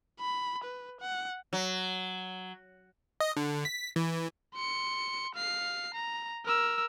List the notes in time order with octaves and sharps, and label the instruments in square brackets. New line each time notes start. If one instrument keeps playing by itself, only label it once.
[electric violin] B5
B4
F#5
[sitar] F#3
[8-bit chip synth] D#5
D3
B6
E3
[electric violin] C6 C#7
F5 C7
A#5
A#4 E6